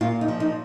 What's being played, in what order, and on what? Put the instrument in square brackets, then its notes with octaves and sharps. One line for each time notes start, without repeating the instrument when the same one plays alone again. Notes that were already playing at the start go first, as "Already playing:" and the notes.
[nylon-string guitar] A#2 F4
D#4
F3
D#4